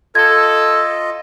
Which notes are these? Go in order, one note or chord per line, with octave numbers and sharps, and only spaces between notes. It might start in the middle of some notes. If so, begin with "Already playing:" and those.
F4 A4 D#5 G#6